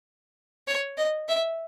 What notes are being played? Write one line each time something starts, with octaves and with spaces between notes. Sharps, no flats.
C#5
D#5
E5